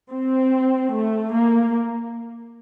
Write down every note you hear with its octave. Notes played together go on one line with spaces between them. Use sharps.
C4
A3
A#3